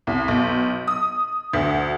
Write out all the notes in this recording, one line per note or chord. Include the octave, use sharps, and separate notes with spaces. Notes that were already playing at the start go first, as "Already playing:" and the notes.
C2
B1
D#6
D2